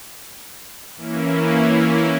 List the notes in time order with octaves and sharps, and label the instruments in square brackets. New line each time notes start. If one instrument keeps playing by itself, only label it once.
[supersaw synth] E3 A#3 C#4 E4